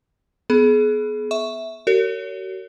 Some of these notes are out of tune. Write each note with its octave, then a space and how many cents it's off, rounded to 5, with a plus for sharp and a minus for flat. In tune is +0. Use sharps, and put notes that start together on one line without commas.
B3 +0 G#4 +35
E5 -10 C#6 +0
F#4 +40 A#4 -35 C#5 +25